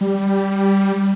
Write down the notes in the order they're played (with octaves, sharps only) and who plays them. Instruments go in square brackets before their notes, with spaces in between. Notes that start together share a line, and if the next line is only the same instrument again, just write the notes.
[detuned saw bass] G3